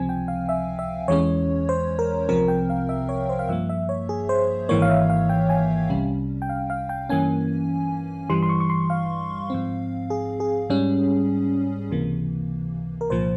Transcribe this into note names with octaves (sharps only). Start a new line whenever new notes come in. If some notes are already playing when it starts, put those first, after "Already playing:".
Already playing: C#2 C3 F3 C4 G#5
G5
F5
E5
E5
E2 E3 G#3 C#4 C#5
C5
A#4
C2 C3 F3 C4 A#4
G5
F5
E5
C#5
C5
F5
G2 F3 A#3 E5
E5
C#5
G#4
C5
G#1 G#2 E3 A#3 C#5
F5
E5
F5
G5
G#5
C2 C3 G3 C#4
G5
F5
F5
G5
G2 E3 A#3 C#4 G#5
G2 E3 G3 C6
C6
C#6
C#6
C6
F5
G#2 F3 C4
G#4
G#4
G#2 G3 C#4
C#2 C3 E3 A#3
A#4
C2 A#2 F3 A#3 C5